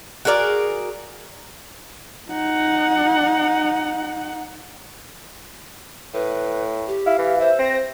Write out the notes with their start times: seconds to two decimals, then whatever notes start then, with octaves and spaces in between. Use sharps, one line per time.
0.25 F#4 G#4 A#4 D5
2.31 D#4 F#5
6.14 A2 B4
6.87 G4
7.06 E4 F5
7.18 E3
7.40 C5 E5
7.59 C4 A#6